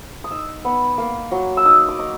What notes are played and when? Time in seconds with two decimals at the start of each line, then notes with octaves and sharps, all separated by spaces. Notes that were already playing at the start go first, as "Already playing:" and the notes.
0.24 D#6
0.31 D#4 E6
0.65 B3
0.98 A#3
1.31 F#3
1.57 E6
1.65 D#4 D#6
1.89 D6
1.99 D#4